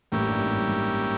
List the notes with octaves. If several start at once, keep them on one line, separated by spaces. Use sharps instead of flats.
A1 A2 G3 A#3 C#4 E4 G4
G2
G#2
G2
G#2